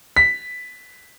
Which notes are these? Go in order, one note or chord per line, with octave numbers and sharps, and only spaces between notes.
B6